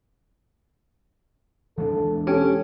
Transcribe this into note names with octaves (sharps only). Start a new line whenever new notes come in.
E3 G#3 D4 A4
C#4 G4 A4